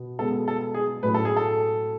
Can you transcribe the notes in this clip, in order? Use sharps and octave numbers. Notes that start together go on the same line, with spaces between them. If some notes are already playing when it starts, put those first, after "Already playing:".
Already playing: B2 B3
B2 G#3 B3 A4
A4
G#4
A2 F#3 A3 C#4 E4 B4
A4
G#4
A4